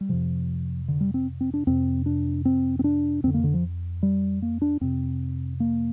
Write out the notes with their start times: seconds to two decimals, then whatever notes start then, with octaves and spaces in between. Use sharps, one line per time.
0.01 G3
0.09 F2 C3 F3
0.88 D3
1.01 G3
1.14 C4
1.41 C4
1.54 D4
1.67 F2 C3 C4
2.06 D4
2.45 C4
2.79 C4
2.84 D4
3.24 F2 D3 C4
3.34 A#3
3.44 D3
3.54 F3
4.03 G3
4.42 A#3
4.62 D4
4.81 F2 C3 C4
5.60 A#3